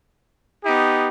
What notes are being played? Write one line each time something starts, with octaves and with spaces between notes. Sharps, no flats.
B3 D#4 G4